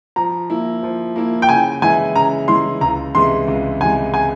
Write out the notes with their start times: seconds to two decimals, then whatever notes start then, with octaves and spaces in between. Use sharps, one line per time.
0.16 F3 A#5
0.50 A#3 E4
0.83 F3
1.16 A#3 E4
1.42 G5
1.49 C#3 G#5
1.82 E3 G#3 E4 G#5
2.15 C#3 A#5
2.48 E3 G#3 E4 C6
2.81 C#2 A#5
3.14 C3 E3 G#3 C6
3.48 C#2
3.81 C3 E3 G#3 G#5
4.14 G#5